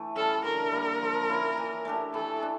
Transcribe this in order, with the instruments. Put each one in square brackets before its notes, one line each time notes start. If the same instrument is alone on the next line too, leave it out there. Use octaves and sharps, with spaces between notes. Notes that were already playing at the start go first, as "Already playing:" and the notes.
Already playing: [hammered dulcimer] E3 A3
[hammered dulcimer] G3 C#4 [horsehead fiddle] A4
[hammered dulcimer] D3 [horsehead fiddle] A#4
[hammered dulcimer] G3 A#3
F3
A#3 C#4 E4
E3
A3 D4 G4
[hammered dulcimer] E3 [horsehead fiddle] A4
[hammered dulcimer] D4